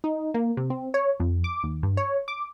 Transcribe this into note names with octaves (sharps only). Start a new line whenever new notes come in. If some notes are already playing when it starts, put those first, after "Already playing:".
D#4
A#3
C3
C4
C#5
F2
D6
D#2
G2
C#5
D6